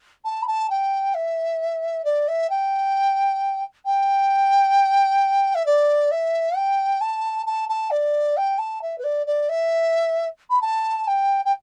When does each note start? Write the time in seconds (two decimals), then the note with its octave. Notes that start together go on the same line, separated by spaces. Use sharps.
0.24 A5
0.42 B5
0.47 A5
0.69 G5
1.14 E5
2.04 D5
2.27 E5
2.49 G5
3.85 G5
5.54 E5
5.65 D5
6.11 E5
6.56 G5
7.00 A5
7.46 A5
7.68 A5
7.90 D5
8.36 G5
8.58 A5
8.81 E5
8.98 B4
9.03 D5
9.26 D5
9.49 E5
10.49 B5
10.61 A5
11.07 G5
11.45 G5